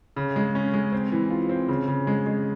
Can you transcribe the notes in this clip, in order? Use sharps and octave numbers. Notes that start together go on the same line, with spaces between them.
C#3
G#3
C#4
G#3
C4
E3
F4
C4
C#3
C#3
G#3
G#3